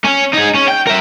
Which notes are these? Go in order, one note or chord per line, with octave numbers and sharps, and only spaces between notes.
C#4
D#4 G#4
C#4
G5
A#4 E5